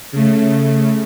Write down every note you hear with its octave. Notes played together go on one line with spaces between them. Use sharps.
C#3 A3